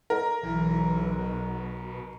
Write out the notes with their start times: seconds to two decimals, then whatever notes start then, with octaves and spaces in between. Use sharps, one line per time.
0.10 A#4
0.43 B1 E3
1.18 B2